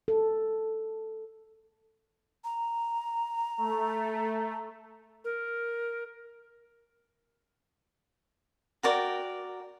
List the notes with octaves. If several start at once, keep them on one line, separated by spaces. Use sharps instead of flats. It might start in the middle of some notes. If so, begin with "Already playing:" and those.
A4
A#5
A3
A#4
F#4 A#4 D5 G5